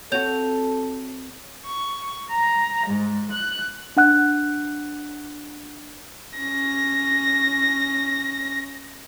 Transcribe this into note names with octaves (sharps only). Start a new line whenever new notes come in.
C4 F#4 A4 C#5 G6 F7
C#6
A#5
G#2
F#6
D4 F#5 F#6
C#4 A#6